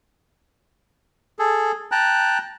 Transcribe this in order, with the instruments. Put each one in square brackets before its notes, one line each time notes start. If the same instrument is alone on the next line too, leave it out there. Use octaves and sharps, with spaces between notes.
[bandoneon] G#4 A4
G5 A5 A#5 F#6